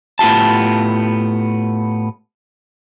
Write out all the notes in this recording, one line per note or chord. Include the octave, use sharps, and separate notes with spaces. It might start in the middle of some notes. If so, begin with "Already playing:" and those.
A2 B3 F4 G4 A5